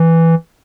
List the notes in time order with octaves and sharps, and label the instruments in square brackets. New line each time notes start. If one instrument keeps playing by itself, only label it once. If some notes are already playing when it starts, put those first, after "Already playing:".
Already playing: [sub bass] E3